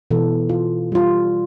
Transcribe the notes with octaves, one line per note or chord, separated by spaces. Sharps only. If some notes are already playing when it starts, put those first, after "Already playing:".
B2 E3 A4
F4
G3 F4